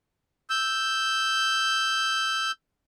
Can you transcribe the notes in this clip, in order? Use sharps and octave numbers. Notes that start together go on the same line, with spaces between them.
E6 G6